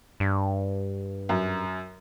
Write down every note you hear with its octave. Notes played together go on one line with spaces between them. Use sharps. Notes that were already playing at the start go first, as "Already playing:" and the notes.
G2
F#2